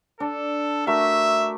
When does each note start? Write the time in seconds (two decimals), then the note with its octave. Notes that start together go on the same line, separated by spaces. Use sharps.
0.20 D4 A4
0.87 A3 F#4 A#4 E5